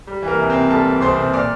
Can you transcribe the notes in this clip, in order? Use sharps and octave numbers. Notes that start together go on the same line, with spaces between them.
G3
E3
A#3 A#4
C2
C3 C4 C5
G3 A4 A5
E3
D6
C2 C5 C6
C3
A#2 D5 D6